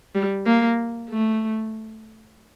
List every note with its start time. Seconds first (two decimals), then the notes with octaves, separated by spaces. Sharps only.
0.15 G3
0.46 A#3
1.10 A3